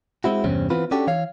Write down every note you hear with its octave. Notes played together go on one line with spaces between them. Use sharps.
G#3 C4 E4 F#4
E2 G2 C3 C4 C#4
E3 B3 C4 F4 B4
C#4 D4 F#4 G4 A4
E3 C#5 F5